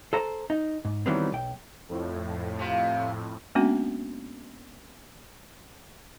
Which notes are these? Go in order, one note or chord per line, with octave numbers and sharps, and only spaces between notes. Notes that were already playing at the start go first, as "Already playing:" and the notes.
A4 C5 A#5
D#4
G#2
D#3 E3 F#3 G3 B3 C4
B1 G5
F2 A2
C3 F4
G#3 A#3 B3 C#4 D4 F#4